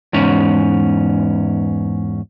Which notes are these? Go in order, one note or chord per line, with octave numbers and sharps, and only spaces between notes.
E2 G#2 C#4